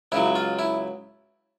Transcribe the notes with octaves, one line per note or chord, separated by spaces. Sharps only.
C#2 C#3 F#3 E4
F4
E4